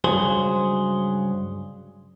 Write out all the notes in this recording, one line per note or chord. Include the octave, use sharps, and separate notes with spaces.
C#2 G2 F#3 G#4 C5